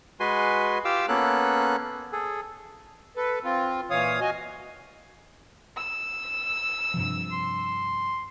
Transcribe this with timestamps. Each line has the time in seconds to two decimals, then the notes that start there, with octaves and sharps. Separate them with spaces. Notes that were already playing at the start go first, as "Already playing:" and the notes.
0.20 G#3 F#4 B4 G#5 C6
0.85 F4 G4 F5 D6 E6
1.08 A#3 B3 C#4 A4 F#6
2.13 G#4 A4
3.16 A4 B4
3.44 C4 F4
3.90 A#2 E3 C#5 F5 D#6
4.20 F#4 D#5 G#5
5.77 E6
6.94 G2 C3 F3
7.32 C6